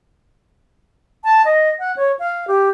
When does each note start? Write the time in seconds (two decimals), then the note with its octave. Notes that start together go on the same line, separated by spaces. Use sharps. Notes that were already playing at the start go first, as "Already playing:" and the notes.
1.24 A5
1.45 D#5
1.79 F#5
1.96 C#5
2.19 F5
2.48 G4